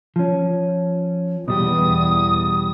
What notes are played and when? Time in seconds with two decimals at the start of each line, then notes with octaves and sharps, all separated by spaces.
0.16 F3 C#4
1.48 E2 B2 G3 G4 D#6